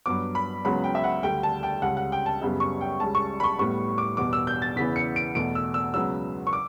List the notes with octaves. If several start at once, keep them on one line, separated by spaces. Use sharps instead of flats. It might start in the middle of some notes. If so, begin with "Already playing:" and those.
G2 F#3 B3 D6
B5
C#2 C#3 F#3 B3 B5
G5
E5
F#5
D2 D3 G3 G5
A5
G5
C#2 C#3 G3 F#5
F#5
G5
A5
F#2 C#3 G3 B3
C#6
G5
C#2 C#3 G3 A5
C#6
B5
C#6
A2 G3 B3 C#6
D6
E2 B2 G3 B3 D6
E6
G6
A6
E2 C#3 E3 B3 B6
C#7
D7
E2 B2 A3 D7
E6
E6
C#2 C#3 F#3 B3 E6
C#6
D6